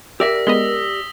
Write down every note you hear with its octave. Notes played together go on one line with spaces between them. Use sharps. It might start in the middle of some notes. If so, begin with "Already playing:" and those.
G4 A#4 D5 E5 E6 A#6 B6
G#3 B3 D#5 D#6 B6 G7